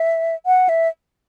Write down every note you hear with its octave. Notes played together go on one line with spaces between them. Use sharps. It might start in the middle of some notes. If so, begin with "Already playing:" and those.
Already playing: E5
F#5
E5